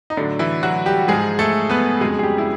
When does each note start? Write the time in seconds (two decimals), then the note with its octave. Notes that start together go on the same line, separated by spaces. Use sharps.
0.10 D#4
0.17 A2 D3 F#3 D4
0.39 E3 E4
0.63 F#3 F#4
0.86 G3 G4
1.08 G#2 F3 G#3 G#4
1.39 A3 A4
1.69 B3 B4
2.00 F2 C#3 F#3 G#3 G#4
2.19 G#4
2.23 G3 G4
2.38 E4